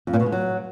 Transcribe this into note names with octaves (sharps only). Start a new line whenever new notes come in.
F2
A#2
B2
G#3
F#3